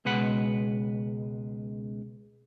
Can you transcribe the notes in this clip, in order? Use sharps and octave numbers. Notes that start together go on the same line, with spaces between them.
C#2 B2 G#3 B4 F#5